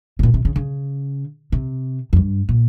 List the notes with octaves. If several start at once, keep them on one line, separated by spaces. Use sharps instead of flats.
C3
A#2
C3
C#3
C#3
C3
F2
G2
A#2